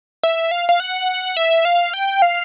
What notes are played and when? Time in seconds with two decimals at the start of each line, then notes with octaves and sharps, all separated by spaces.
0.23 E5
0.51 F5
0.69 F5
0.80 F#5
1.37 E5
1.65 F5
1.94 G5
2.22 F5